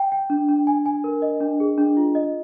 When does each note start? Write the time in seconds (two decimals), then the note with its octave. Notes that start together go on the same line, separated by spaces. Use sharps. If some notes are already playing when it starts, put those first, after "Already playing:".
Already playing: G5
0.12 G5
0.30 D4
0.49 D4
0.67 G#5
0.86 G#5
1.04 A#4
1.22 D#5
1.41 D4
1.60 G#4
1.78 D4
1.97 F4
2.15 D#5